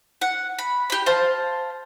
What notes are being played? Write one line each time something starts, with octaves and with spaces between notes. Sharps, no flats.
F#5
B5
G4 B5
C5 F5 A5